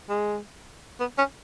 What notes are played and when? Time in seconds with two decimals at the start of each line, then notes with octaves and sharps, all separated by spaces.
0.09 G#3
1.00 B3
1.18 C#4